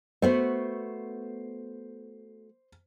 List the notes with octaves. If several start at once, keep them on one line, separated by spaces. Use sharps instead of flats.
A3 B3 F#4 C5